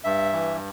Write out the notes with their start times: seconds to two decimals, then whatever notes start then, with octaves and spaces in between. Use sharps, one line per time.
0.04 G2 E5
0.32 E3